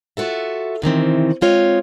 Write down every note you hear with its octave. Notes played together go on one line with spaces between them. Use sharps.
F4 F#4 A4 E5
C3 D#3 E3 C4
G#3 C4 F4 C#5 D#5